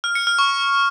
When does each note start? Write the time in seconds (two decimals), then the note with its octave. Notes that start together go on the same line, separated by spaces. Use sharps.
0.04 F6
0.15 C#7
0.27 F6
0.39 C#6